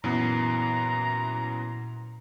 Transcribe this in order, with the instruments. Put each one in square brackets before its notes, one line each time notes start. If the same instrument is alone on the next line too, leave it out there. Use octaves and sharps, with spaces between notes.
[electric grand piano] F#2 E3 B3 [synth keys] A#2 C7 [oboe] A#5